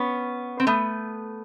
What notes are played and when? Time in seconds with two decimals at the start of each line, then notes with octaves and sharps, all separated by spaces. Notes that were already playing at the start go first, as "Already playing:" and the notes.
Already playing: B3 C#4
0.60 C4
0.67 A3 B3